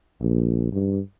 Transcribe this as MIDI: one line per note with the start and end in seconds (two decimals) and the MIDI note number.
0.20 0.68 34
0.72 1.00 43